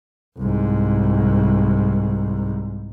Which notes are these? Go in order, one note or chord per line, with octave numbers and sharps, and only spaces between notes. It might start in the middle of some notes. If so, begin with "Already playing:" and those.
C2 G#2